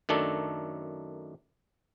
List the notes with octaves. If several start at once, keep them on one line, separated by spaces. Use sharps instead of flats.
F#2 D#3 A3 D4 A4